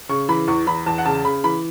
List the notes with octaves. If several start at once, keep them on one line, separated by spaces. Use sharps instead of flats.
C#3 C#6
E3 B5
E2 C#6
E2 B5
E2 A5
F#5
C#3 A5
C#3 B5
E3 B5